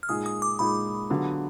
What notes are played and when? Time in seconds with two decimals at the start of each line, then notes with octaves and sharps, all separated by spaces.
0.03 F6
0.09 A#2 G#3 D#4 G#4 D#6
0.26 D#6
0.42 D6
0.59 A#2 G#3 D#4 G#4 B5
1.10 D3 F#3 B3 F4 G#4